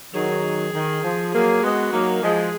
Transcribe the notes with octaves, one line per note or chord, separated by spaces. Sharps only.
D#3 F#3 G#4
D#3
F3
F#3 A#3 G#4
G#3 B3 F#4
F#3 A#3 D#4
F3 G#3 G#4